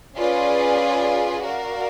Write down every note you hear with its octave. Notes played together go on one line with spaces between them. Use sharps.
C#4 F4 G#4 B4 D5
F#4 A#4 D5 F5